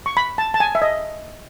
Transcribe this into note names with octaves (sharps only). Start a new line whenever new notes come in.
C#6
B5
A5
A5
G#5
E5
D#5